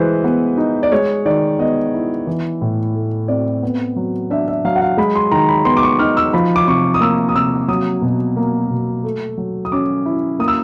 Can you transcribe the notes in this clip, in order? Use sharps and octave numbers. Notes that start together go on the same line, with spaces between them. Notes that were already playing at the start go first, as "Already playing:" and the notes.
Already playing: E3 G#3 B4 C5
B3
D#4
D5
G#3 C#5
D#3 D5
B3 D#5
E4
E3
A2
A3
C4 D5
B3
F#3
D4 E5
E5
F#3 F5
F#5
F5
G#3 B5
C6
D#3 A#5
B5
B3 C6
D6
C#6
D#4 F6
E6
F3 B5
D6
C3 C#6
D#6
A#3 E6
D#6
C3 E6
F#3 D#6
B2
A#3
B2
A3
F#3
D#6
C#4 D6
E4
A#3 D#6
E6